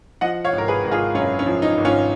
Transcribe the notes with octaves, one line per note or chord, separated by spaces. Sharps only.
F3 D#5 F#5
C#5 F5
G#1
A#4
G#4 B4
G#1
F4 G#4
F#2 C#4 F4
C#4
F3
D#4
G#1
C#4 F4